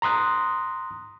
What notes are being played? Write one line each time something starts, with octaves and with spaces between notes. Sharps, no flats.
A#5 C6 D#6 F#6